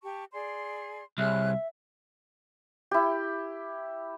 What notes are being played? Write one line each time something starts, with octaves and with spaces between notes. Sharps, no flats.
G4 A5 C#6
G#4 D5 C6
C2 G#4 C#5 E5 F#6
E4 G4